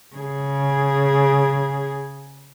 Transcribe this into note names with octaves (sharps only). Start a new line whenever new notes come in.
C#3 G#4